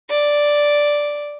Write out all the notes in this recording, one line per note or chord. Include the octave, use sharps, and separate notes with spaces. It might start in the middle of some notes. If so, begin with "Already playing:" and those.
D5